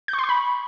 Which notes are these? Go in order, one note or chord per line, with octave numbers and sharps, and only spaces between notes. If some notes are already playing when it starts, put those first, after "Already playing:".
G6
C#6
C6
C#6
B5